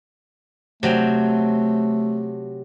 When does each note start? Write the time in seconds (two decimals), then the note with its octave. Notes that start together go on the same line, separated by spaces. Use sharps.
0.83 C3 F#3 A3 G5